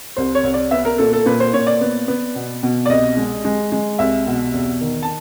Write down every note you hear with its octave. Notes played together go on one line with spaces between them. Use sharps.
C2 C5
C#5
C2
D5
B3 E5
A#4
A#2 A4
A4
A#2 B4
C5
A#2 C#5
D5
B3
B3
B2
B2
D5
C2 D#5
G#3
G#3
G#3
C2 E5
B2
E2
D#3
A5